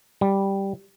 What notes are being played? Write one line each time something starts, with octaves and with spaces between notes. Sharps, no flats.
G3